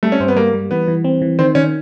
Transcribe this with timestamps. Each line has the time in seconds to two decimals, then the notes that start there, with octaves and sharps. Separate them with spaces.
0.03 G3 A3
0.12 C#4
0.20 G2 C4
0.28 B3
0.36 G3 A#3
0.54 G3
0.71 E3 B3
0.88 E3
1.04 C4
1.22 E3
1.39 D#3 C4
1.55 D#3 C#4